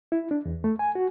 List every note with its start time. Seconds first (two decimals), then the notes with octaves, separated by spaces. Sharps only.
0.12 E4
0.31 D4
0.45 E2
0.64 A3
0.79 G#5
0.95 F#4